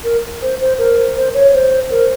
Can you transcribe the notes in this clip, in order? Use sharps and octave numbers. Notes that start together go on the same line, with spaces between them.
A#4
C5
C5
A#4
C5
C#5
C5
A#4